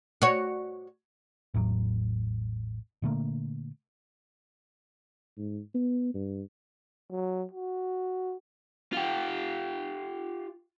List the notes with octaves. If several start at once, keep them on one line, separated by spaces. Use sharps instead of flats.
F#4 C#5
A1 E2 A2 F#3
A#2 D3 A3 A#3
G#2
B3
G2
F#3
F#4
F4 G4